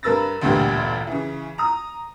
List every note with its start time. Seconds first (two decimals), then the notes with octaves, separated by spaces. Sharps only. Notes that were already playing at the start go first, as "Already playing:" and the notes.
0.03 G2 A#4 B4 E6 A6 A#6
0.41 A1 D2 G2 A#2 B3 G4
1.07 C#3 E3
1.58 A#5 D#6